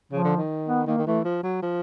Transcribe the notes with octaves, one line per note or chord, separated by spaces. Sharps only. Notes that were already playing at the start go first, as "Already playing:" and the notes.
C#3 F3
D3
D#3
B3
D#3 A#3
D#3
E3 A3
F3
F#3
F3